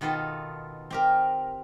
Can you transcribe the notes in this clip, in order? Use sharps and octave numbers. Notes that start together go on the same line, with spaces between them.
B2 D#3 B3 F4 A4
C4 G4 A#4